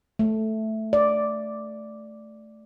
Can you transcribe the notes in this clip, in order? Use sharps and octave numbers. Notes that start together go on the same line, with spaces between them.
A3
D5